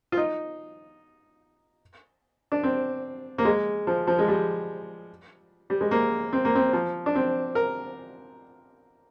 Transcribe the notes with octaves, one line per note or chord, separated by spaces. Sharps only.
F4
D#4
D4
C4
A#3
G#3
F3
F3
G#3
G3
G3
G#3
A#3
C4
A#3
C4
F3
D4
C4
A#4